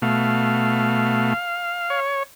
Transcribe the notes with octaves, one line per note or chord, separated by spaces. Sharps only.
B2 A3 F5
C#5